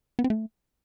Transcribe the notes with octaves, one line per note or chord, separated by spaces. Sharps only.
B3
C4
A3